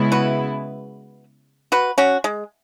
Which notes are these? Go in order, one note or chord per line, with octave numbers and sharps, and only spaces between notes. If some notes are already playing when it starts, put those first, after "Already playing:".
Already playing: C#3 G#3 B3 E4
F#4 B4
F#4 B4
C#4 F#4
G#3